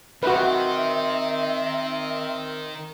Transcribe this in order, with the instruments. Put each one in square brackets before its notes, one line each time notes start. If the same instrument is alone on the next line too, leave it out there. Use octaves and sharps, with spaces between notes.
[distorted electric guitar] D#3 [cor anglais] C4 [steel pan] F#4 B4 [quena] E5